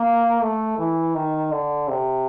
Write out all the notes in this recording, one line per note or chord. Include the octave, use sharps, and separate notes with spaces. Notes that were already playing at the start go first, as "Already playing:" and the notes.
Already playing: A#3
A3
E3
D#3
D3
C3